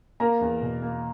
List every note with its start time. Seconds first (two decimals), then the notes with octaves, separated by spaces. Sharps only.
0.20 A#3 A#4 A#5
0.41 E2
0.62 B2
0.82 A#3